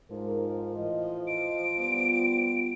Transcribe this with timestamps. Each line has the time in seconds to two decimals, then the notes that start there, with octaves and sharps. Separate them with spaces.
0.10 G#2 F3 A#4
0.75 A2 E3 D#5
1.27 D7
1.78 G3 B3 F4